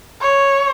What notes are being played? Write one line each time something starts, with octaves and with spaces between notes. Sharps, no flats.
C#5